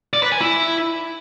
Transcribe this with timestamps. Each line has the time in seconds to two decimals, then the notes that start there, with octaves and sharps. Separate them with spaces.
0.14 D5
0.23 B4
0.32 G#5
0.41 E4